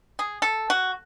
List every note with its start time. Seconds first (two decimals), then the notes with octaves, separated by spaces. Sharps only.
0.19 G#4
0.42 A4
0.70 F#4